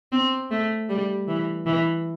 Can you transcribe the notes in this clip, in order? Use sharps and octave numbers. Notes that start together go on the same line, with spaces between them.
C4
A3
G3
E3
E3